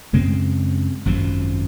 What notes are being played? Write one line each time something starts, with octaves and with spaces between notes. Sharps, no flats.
F#2 C#3 G#3 C4
G#1 F#2 F3